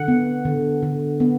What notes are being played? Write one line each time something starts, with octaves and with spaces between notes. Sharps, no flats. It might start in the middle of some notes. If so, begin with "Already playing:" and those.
Already playing: D3 F#5
B3
D3
D3
B3